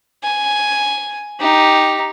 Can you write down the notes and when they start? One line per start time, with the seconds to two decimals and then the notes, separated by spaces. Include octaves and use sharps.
0.24 G#5
1.40 D#4 G4